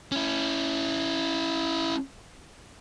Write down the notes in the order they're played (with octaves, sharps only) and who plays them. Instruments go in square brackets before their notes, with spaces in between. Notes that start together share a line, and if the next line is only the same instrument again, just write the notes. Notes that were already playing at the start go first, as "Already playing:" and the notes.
[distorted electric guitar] C#4 E4